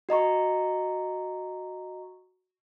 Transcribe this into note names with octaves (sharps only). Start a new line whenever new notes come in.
F#4 D#5 A#5 C#6